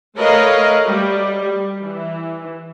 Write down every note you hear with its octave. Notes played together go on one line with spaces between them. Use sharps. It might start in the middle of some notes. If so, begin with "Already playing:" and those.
A3 A#4 B4 C#5 D#5 F5
G3
E3